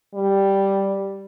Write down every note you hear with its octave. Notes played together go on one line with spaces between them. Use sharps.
G3